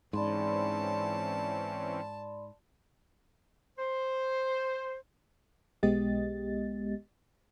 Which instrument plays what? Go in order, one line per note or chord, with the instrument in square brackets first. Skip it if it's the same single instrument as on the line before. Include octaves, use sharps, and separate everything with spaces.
[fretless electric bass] G#2 [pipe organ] E3 C4 C#4 [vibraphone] D5 B5 C6 [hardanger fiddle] A5
[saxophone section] C5
[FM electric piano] B1 G#3 B3 G4 D#5 A6